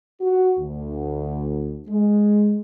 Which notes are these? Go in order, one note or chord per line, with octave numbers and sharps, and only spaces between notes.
F#4
D2
G#3